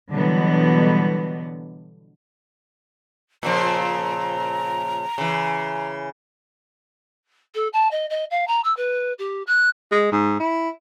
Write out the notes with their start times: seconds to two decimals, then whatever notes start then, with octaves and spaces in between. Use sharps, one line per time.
0.12 B2 D3 E3 F#3 G3 B3
3.43 A#2 C#3 F3 A#5
5.18 C#3 E3
7.54 A4
7.73 A5
7.91 D#5
8.10 D#5
8.30 F5
8.47 A#5
8.64 E6
8.76 B4
9.18 G4
9.46 F#6
9.91 G#3
10.12 G#2
10.40 E4